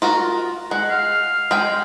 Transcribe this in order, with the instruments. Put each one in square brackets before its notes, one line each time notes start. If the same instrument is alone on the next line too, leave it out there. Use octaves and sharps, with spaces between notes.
[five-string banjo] F4 F#4 A#4
[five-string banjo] G#3 [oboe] F#5
[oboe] F5
[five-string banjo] G#3 G5